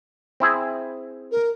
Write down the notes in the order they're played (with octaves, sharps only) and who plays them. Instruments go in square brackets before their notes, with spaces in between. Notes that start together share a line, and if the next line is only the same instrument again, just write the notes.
[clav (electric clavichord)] C4 E4 G#4
[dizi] A#4